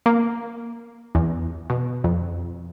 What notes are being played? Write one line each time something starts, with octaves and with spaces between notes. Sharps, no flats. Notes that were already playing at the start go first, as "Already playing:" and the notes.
A#3
E2
B2
F2